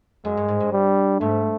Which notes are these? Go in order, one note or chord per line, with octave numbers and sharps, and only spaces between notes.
F#2 G#3
G2
G#2
G2
G3
G#2 A3